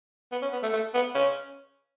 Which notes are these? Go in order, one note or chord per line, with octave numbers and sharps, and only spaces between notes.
B3
C#4
B3
A3
A3
B3
C#4